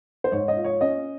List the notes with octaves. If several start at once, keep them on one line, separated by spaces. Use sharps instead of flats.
C5
G#2 C#5
D#5
F4
C#5
C#4 D#5